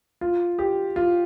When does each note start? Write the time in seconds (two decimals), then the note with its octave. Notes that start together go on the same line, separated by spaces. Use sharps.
0.21 F4
0.59 G4
0.96 F4